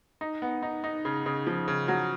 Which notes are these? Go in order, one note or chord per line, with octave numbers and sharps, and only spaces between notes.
D#4
B3
D#4
D#4
C#3
C#3
F3
C#3
F#3